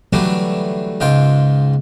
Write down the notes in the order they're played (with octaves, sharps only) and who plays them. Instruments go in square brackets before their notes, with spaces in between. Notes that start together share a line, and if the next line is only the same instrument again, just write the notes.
[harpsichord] D3 E3 F#3 G3 A3 D4
C#2 G#2 F4 G5